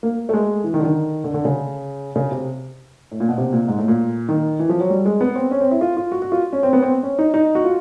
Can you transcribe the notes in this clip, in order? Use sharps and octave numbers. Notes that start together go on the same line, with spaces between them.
A#3
A3
G#3
E3
D#3
D3
D#3
D3
D3
C#3
C#3
C3
A2
A#2
B2
C3
A#2
G#2
A2
A#2
D#3
E3
F3
F#3
G3
G#3
B3
C4
C#4
C4
E4
F4
F4
F#4
F#4
F4
C#4
C4
B3
C4
C#4
D#4
D#4
F#4
F4